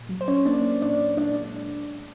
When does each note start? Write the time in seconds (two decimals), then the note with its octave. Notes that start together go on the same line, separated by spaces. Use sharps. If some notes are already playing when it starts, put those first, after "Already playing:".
Already playing: A#2
0.09 F#3
0.21 C5
0.28 C#4 C#5
0.45 A#3 D4 D5
0.82 A#2 D4 D5
1.17 G#3 D4 D5